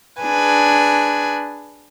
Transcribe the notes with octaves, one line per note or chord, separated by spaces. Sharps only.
D4 G#4 B4 G#5